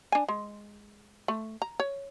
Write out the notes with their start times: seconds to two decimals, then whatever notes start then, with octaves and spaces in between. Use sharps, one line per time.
0.12 D4 G#5
0.28 G#3
1.28 A3
1.62 A#5
1.80 C#5